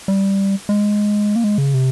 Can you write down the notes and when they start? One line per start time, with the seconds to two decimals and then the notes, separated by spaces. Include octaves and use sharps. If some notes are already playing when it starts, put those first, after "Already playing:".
0.08 G3
0.69 G#3
1.36 A#3
1.44 G#3
1.58 C#3
1.74 C3